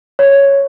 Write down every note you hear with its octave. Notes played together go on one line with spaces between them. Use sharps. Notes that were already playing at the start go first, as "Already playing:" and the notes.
C#5